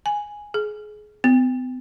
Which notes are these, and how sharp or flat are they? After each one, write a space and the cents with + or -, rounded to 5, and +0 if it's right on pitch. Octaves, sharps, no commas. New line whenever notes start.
G#5 +0
G#4 +25
B3 +45